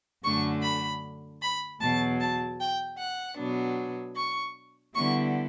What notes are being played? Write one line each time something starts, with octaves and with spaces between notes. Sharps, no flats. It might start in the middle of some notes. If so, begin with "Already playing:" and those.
F#2 D3 A3 D4 C#6
B5
B5
E2 B2 F#3 A5
A5
G5
F#5
B2 F#3 B3 D4
C#6
D3 G3 B3 E4 C#6